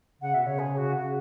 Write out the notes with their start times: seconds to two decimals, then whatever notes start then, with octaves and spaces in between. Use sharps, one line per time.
0.21 C#3 F#5
0.34 B2 E5
0.46 C#3 C#5
0.59 G#4
0.77 F#4
0.96 C#3 F#4